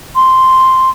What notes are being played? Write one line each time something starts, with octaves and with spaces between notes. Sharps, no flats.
C6